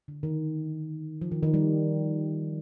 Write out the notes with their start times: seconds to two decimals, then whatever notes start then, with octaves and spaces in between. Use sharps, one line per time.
0.08 D3
0.23 D#3
1.22 F3
1.32 D#3
1.43 D#3
1.54 G3